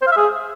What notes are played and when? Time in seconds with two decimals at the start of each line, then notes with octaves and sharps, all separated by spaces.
0.02 C5
0.07 F5
0.12 E5
0.17 G#4